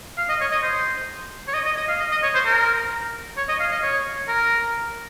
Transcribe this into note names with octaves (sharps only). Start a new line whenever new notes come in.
F5
D#5
C#5
D#5
C5
C#5
D#5
D#5
D#5
F5
D#5
D#5
C#5
C5
A#4
C#5
D#5
F5
D#5
C#5
A#4